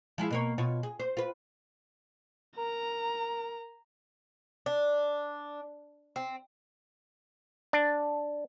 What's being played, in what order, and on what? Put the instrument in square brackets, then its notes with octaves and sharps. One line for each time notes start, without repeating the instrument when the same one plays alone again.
[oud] F3 G#3 E4
B2 A#3 C#5
B2 F4 C#5
G#4
C5
F4 B4
[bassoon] A#4 [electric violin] A#5
[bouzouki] D4
C4
[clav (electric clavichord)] D4